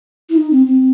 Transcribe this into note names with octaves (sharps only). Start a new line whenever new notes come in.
E4
D#4
C4
C4